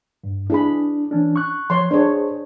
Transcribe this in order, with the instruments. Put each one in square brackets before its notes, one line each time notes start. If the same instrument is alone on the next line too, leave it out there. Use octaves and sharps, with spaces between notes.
[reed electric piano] G2
[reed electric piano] D4 [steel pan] E4 G#4 B5
[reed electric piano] E3 C#4 D4
C#6 F#6
[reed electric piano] F3 [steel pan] C#5 C6
[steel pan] D4 C#5 [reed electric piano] G#4 C5